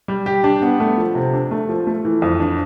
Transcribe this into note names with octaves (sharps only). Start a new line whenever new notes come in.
G3
G4
D4
B3
A3
F3
C3
D4
A3
F3
A3
E3
F2
D4